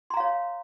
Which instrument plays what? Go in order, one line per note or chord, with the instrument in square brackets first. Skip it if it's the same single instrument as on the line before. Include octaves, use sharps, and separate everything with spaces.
[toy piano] C6
A#5
F5
C#5